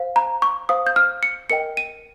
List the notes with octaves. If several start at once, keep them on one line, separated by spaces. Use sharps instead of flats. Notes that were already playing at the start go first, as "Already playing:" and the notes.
Already playing: C5 F5
A#5
C#6
C5 F5 D#6
G6
F6
C#7
A#4 D#5 G5 C#7
D#7